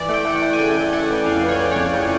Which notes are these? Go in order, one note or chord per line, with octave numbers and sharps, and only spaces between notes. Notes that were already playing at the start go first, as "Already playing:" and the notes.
Already playing: E3 D5
A3 G5
A3 F#5
G5
A3
G#5
C#3 G5
A3
A3 F#5
E3
F2 F5
E3
C#5
E3
F2 C#5
C#3